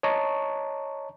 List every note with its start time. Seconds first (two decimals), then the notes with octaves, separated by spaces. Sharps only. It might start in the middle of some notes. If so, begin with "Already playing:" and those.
0.03 C#5 D#5 A5 A#5 C#6